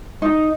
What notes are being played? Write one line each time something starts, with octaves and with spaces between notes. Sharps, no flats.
D#4